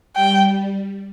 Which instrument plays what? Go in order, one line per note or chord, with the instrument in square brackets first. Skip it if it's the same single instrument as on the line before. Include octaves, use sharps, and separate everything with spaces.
[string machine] G3 [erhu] G5